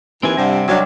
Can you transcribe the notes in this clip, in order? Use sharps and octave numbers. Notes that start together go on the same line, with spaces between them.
D#2 E3 C4 E4 G#5
G2 C3 G3 D5 F#5
C2 F#3 D4 C#5 D#5 G#6